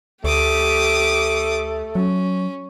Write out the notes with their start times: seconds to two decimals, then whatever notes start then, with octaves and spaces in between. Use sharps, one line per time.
0.24 D2 A3 G4 D6 D#6
1.95 F#3 C#4